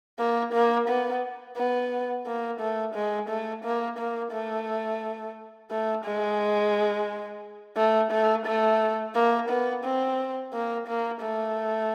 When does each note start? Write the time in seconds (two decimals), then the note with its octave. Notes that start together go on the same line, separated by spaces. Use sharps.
0.19 A#3
0.53 A#3
0.89 B3
1.57 B3
2.26 A#3
2.60 A3
2.94 G#3
3.29 A3
3.64 A#3
3.98 A#3
4.32 A3
5.71 A3
6.05 G#3
7.76 A3
8.11 A3
8.46 A3
9.15 A#3
9.49 B3
9.84 C4
10.53 A#3
10.87 A#3
11.21 A3